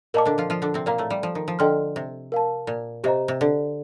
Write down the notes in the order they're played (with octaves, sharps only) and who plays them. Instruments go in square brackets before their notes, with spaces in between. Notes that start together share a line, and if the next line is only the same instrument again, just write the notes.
[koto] A#2 A#3 [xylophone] A#4 D#5 A5 D6
[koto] D3 D4
F3 F4
F3 F4
D3 D4
C3 C4
[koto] A#2 A#3 [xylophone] D5 F5 A#5
[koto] A2 A3
G3
F3
D#3
F3
[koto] D3 [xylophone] A4 D#5 G5 C6 F6
[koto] C3
[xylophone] A#4 F5 A5
[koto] A#2
[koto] C3 [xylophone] G4 C5 D#5 A#5
[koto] C3
D3